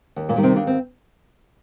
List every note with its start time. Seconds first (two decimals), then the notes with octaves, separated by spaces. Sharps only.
0.16 D#2
0.29 A#2 A#3
0.36 D#3 G3
0.43 C3 C4
0.56 D#2 D4
0.67 C4